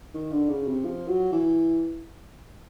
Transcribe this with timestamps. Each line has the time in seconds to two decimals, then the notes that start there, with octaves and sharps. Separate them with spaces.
0.14 D#3
0.32 D3
0.49 C#3
0.68 C3
0.85 F3
1.08 F#3
1.32 E3